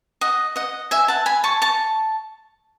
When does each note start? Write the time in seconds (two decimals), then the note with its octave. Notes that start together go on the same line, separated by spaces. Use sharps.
0.21 D#5 F#5
0.56 D#5 F#5
0.91 E5 G#5
1.08 F#5 A5
1.26 G#5 B5
1.44 A5 C#6
1.62 A5 C#6